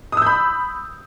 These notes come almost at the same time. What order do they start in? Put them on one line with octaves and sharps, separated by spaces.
D#6 E6 G6 B5